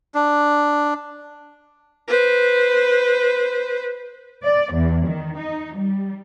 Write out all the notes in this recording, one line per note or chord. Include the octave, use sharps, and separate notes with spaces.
D4
B4 C5
D5
E2
D#3
D#4
G3